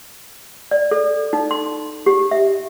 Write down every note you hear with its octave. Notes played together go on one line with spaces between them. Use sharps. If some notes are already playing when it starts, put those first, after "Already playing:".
D5
A4
D#4
C6
G4
E5